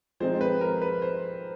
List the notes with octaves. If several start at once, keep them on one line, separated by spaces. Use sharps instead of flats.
F3 G#3 C4 D#4 C5
B4
A#4
B4
C5